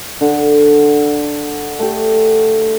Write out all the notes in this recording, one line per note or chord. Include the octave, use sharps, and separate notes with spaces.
D3
A3 G4